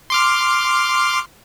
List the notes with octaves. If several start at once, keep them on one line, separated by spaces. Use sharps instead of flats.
C6 D6 F6